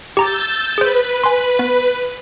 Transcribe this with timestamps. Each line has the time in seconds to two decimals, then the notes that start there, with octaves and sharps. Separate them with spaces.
0.17 G4 A#5 D6 E6 G6 A6
0.78 G#4 B4 C5
1.24 G#5 C6
1.59 B3